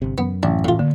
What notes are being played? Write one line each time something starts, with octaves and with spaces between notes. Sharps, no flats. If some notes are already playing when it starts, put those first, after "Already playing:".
G1 C3
F#2 B3
A1 D4
A2 F4
D3 A#3